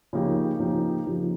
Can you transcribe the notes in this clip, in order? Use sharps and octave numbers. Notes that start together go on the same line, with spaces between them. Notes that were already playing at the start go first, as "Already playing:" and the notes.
C#3 F3 A#3 D#4 G4
C#3 F3 A#3 D#4 G4
C#3 F3 A#3 D#4 G4